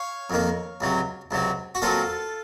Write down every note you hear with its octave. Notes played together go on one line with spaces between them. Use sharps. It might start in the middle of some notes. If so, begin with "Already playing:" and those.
Already playing: C#5 F5
F2 D#3 A#3
C#2 C3 F#3
C#2 C3 F#3
F#4
A#2 F#3 C4 F4 A4